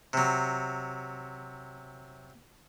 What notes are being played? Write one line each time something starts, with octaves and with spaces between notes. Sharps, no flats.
C3 F#3